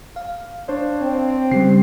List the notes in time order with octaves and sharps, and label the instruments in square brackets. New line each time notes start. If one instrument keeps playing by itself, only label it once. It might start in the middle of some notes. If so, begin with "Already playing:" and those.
[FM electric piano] F5
[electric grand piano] D4 C5 C#5
[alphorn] C4
[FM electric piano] C#3 G3 [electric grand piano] G4 C7